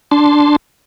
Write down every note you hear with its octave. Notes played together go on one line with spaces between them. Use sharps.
D4 A5 C6